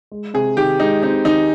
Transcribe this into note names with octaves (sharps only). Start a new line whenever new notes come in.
G#3
C3 G#4
D#3 G4
G#3 D#4
C4 D#4
D#3 D#4